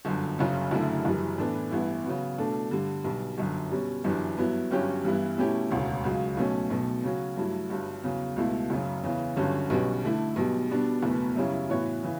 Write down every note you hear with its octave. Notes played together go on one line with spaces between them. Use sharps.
G1 F#2 D3
F#1 F#2 C#3
F#1 F#2 D3 A3 E4
F#1 F#2 E3 G3
A2 E3 B3 D4 A4
A1 G2 E3 B3 E4
C#3 F#3 B3
B2 A3 D4 A4
G2 D3 G3
B1 B2 G3
G1 F#2 D3
B2 G3 C#4
G1 F#2 E3 G3 D4
G2 F#3 B3 E4
G1 G2 F#3 C#4 G4
G2 E3 G3 B3 E4
B2 A3 C#4 E4 G4
E1 D2 C#3
C#2 C#3 F#3
B1 B2 F#3 A3 C#4
B1 B2 A3
C#3 F#3 C#4 F#4
G2 F#3 A3 E4
G1 G2 F#3
E2 C#3 F#3
C#2 B2 A3 E4
F#1 F#2 C#3
E2 C#3 E3
G1 G2 D3 F#3 C#4
B1 B2 G3 C#4 F#4
D3 A3 E4
B1 B2 G3
B2 G3 B3 D4
F#1 E2 B2 A3
F#2 C#3 G3 C#4 E4
A2 E3 B3 F#4 C#5
C#3 E3